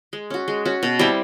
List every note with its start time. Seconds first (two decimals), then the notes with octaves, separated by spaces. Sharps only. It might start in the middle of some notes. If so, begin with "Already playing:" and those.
0.13 G#3
0.30 C#4 F#4
0.48 G#3
0.65 C#4 F#4
0.83 B2
0.99 G3 C4 E4